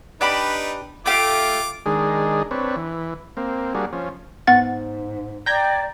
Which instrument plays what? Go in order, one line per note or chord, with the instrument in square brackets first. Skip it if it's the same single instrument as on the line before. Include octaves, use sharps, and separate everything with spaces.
[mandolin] D4 G4 B5 [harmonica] D#4 B4
[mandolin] A3 G4 F5 [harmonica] F4 D6
[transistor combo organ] D#3 G#3 D4 G#4
C4 D4 B4 C#5
E3
A#3 C4
G3 A#3 D4 F#4 G#4
F3 C#4
[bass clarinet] G#2 [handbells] B3 F#5 A6
[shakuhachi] D5 [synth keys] G5 A#5 G#6